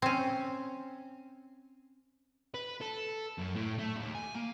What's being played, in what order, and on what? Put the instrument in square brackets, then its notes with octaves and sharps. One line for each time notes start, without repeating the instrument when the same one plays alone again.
[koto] C4 C#4
[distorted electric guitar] B4
A4
F#2
A2
A3
D#2
G#5
A#3